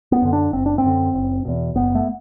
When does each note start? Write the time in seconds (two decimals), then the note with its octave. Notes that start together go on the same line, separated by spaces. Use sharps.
0.12 B3
0.22 F#2 D3
0.33 D4
0.53 F#1 C4
0.66 D4
0.78 C4
0.84 F#2 D3
1.14 F#1
1.45 E2 B2
1.75 F#1 B3
1.95 A3